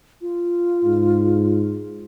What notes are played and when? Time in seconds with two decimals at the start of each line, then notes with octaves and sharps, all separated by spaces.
0.22 F4
0.84 G#2